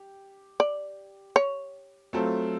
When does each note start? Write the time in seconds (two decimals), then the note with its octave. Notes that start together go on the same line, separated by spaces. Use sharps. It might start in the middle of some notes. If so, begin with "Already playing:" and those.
Already playing: G4
0.60 D5
1.36 C#5
2.13 F#3 A3 C4 F4 A4